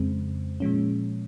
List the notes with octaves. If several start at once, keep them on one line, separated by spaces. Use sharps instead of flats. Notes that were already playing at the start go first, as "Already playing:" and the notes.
Already playing: F2 C#3 G#3 C4
A#2 F3 G#3 C#4